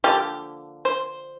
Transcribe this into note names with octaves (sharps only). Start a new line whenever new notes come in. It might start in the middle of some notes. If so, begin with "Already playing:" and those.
D3 F3 A#3 G4
C5